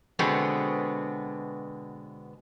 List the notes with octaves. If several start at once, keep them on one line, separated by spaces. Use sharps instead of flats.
B2 D3 G#3 B3 C4